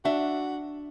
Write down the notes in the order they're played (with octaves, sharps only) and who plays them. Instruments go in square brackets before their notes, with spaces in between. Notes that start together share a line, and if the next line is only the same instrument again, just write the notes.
[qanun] D4 [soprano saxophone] F#4 [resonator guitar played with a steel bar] E5